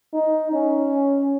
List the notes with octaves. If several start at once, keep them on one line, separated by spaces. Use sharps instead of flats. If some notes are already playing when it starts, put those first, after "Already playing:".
D#4
C#4